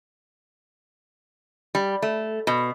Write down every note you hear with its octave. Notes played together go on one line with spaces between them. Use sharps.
G3
A3
B2